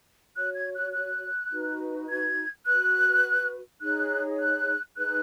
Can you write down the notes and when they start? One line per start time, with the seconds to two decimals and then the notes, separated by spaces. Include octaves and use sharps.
0.36 F#4 C#5 F#6
0.55 G#6
0.75 F#6
0.93 F#6
1.52 D#4 F#4 B4
2.09 G#6
2.66 F#4 B4 F#6
3.81 D#4 G#4 C#5 F#6
4.39 F#6
4.96 D#4 G#4 B4 F#6